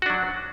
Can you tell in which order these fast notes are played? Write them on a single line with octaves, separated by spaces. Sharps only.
F#4 D4 F#3